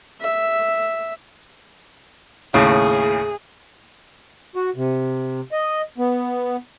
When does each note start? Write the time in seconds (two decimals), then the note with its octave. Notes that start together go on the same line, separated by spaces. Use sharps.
0.21 E5
2.54 D#2 A2 C#3 G#4
4.56 F#4
4.76 C3
5.52 D#5
5.98 B3